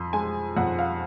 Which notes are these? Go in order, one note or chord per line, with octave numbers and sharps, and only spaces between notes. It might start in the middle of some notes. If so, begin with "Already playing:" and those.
Already playing: F2 C6
G#3 G#5
F2 F#5
F5